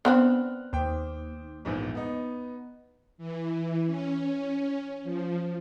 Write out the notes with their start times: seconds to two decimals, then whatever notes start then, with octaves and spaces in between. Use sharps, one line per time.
0.05 B3 C4 D4 F6 F#6
0.73 D#2 C5 G5
1.65 A#1 E2 G#2
1.95 B3 D#4
3.18 E3
3.87 C#4
5.03 F3